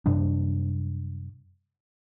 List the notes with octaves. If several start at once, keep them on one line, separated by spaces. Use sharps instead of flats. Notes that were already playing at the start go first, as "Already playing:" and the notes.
F#2 C3 G3 D4